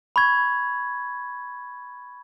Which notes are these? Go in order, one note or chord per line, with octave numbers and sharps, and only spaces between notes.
B5 C#6 G#6